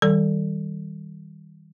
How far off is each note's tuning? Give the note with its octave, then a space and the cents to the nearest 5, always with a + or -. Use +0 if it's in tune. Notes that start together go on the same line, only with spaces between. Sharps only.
D#3 +35 G3 +0 A4 +15